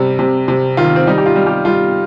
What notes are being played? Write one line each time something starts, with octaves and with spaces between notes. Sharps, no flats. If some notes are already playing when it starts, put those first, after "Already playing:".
Already playing: C3 G3
C3
C3
D#3 F4
C4
G3 D#4
G4
F4
G3
G4
G3 F4